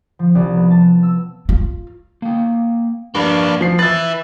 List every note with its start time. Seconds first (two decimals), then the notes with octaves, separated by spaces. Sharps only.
0.19 F3
0.35 C2
0.57 B3
0.71 A5
1.03 E6
1.49 F4
2.22 A#3 G5
3.15 G2 A#3 D4
3.61 F3 C7
3.79 B4 E5 A6